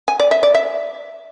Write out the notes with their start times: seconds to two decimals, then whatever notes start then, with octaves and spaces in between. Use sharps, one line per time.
0.08 G#5
0.20 D5
0.31 E5
0.43 D5
0.55 E5